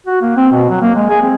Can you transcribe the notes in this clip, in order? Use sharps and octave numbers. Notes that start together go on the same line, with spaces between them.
F#4
A#3
C4
B2
F#3
A#3
G#3
G#4
C4